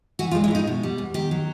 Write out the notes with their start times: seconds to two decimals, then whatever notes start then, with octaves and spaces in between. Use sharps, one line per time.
0.19 E3 F#4
0.31 F4
0.35 G#3
0.44 E4
0.51 A2 D#4
0.67 B2
0.83 G3
0.98 E2
1.14 D#3 G4
1.31 F#3